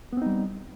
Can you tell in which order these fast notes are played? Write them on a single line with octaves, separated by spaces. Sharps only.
B3 C4 D#4 G3